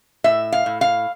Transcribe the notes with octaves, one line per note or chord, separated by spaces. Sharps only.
A2 E5
F5
A2
F5